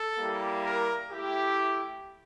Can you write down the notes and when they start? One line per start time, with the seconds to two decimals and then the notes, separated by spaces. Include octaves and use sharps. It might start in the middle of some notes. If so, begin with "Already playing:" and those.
Already playing: A4
0.17 G3 A#3 E4 G4
0.64 A#4
1.11 A3 E4 G4